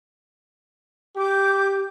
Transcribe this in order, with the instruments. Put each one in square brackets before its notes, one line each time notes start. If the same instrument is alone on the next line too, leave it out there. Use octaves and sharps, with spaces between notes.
[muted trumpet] G4 [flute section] D6 G6